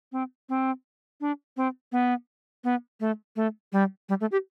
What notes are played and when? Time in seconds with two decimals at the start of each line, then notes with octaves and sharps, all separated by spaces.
0.12 C4
0.49 C4
1.21 D4
1.57 C4
1.92 B3
2.64 B3
3.00 A3
3.36 A3
3.72 G3
4.09 G3
4.21 A3
4.32 G4